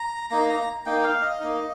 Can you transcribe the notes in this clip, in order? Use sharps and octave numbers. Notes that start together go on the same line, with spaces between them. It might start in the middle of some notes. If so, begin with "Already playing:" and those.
Already playing: A#5
A#3 D#4 A#5
A#5
A#3 D#4 G5
F5
D#5
A#3 D#4